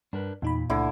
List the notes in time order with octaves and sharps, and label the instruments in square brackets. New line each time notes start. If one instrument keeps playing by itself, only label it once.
[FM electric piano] G2 [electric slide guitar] D4 A#4 B4
[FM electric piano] E2 D#4 B5 [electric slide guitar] A#2
[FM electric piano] C#2 A3 [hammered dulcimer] D3 E4